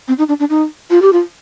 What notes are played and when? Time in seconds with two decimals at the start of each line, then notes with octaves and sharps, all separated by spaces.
0.08 C4
0.18 D#4
0.29 D4
0.40 D4
0.50 D#4
0.90 F4
1.02 G4
1.13 F4